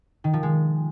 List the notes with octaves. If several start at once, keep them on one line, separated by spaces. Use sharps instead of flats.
D#3
F3
G#3